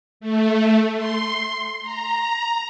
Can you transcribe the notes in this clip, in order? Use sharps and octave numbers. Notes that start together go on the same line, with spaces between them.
A3
C6
A#5